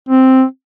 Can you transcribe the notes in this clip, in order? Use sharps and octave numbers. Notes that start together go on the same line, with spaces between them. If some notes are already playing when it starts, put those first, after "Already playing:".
C4